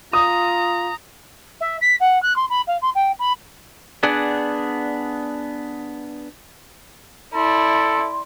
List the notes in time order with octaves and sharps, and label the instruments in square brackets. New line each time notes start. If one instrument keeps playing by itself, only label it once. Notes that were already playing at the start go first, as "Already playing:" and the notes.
[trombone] F4 [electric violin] A#5 [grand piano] D#6
[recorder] E5
B6
F#5
F#6
C6
B5
F5
C6
G5
B5
[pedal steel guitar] B3 D4 G#4 D5 F#5
[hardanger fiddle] E4 D5 [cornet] A4 [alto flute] C6